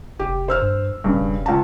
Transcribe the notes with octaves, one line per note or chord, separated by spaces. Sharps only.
F1 G4
C5 E6 F6
G2
D1 G2 C#3
E1
C#2 A5